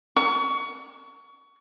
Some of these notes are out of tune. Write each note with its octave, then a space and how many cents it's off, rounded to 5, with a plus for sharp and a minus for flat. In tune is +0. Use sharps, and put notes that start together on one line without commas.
C#6 +25